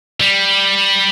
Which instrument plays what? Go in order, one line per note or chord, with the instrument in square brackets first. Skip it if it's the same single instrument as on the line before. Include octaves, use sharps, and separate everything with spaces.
[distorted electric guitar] G3